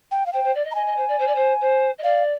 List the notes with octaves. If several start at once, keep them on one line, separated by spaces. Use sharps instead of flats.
G5
F5
C5 G5
C5
D5
D#5
A#5
D#5 G#5
D#5
C5
D5
C5
D5
C5
C5
D#5
D5 F5